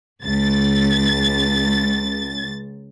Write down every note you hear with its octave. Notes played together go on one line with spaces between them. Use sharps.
C#2 A6